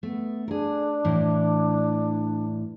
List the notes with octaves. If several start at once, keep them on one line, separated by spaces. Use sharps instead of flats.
A3 B3
D4 G#4 A#4
A2 E3